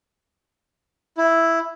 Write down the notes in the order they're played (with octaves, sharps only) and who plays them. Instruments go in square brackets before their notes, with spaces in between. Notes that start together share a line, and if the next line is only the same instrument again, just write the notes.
[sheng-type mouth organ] E4